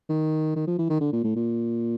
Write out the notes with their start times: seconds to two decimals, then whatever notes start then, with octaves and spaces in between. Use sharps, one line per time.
0.09 D#3
0.56 D#3
0.67 F3
0.79 E3
0.90 D#3
1.01 D3
1.13 A#2
1.24 A2
1.36 A#2